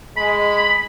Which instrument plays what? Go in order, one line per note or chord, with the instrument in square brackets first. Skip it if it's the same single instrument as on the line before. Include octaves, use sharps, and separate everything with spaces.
[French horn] G#3 [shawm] B5